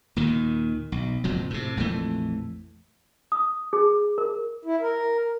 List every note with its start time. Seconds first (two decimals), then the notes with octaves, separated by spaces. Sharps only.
0.16 D#2 A#2 D#3
0.92 B1
1.24 F#1 F2 A2 F#3
1.50 A2 C3
1.77 A#1 F2 E3 A3
3.32 D#6
3.73 G#4
4.18 A#4
4.65 E4
4.81 A#4